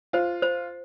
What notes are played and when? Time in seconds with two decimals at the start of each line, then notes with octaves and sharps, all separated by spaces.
0.13 F4 C5
0.42 C5